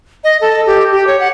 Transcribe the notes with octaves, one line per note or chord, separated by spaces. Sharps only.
D#5
A4
G4
G4
C#5
F#5